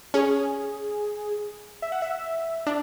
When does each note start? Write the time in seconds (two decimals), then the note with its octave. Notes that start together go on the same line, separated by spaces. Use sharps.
0.14 C#4 G#4
1.82 E5
1.92 F#5
2.02 E5
2.67 D4